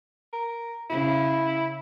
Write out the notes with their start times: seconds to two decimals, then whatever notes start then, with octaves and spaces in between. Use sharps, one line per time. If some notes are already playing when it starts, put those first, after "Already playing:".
0.33 A#4
0.90 C#3 E4